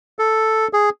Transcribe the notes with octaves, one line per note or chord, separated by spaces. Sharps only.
A4
G#4